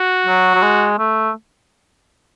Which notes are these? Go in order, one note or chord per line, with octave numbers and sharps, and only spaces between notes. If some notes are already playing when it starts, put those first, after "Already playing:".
Already playing: F#4
F#3
F#3
G#3
A3